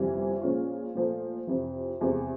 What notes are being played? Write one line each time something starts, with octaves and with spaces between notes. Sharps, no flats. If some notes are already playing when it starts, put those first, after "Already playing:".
Already playing: G1 F2 C3 E3 G3
A#2 F3 G#3 C#4 F4
A#2 F3 A3
F2 C3 E3
E2 C3 F3 G#3 C4